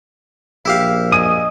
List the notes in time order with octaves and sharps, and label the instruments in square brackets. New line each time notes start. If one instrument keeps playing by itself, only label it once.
[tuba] A#1 [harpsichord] E4 G4 F5
[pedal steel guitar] D#5 G#5 D#6 [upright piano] D#7